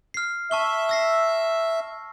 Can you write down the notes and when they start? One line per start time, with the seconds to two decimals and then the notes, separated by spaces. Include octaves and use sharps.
0.14 F6 C7
0.51 E5 A5 C#6 G7
0.89 E6 A#6 C7